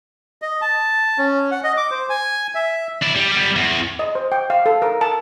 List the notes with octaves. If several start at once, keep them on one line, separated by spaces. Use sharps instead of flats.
D#5
A5
C#4
F#5
D#5
D6
C5
G#5
E5
D4 E4
G3
G3 B3
E2
D#5
C5
G5
F5
A4
A#4
A5